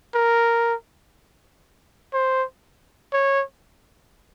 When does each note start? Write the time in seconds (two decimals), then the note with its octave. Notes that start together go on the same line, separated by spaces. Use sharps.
0.15 A#4
2.14 C5
3.13 C#5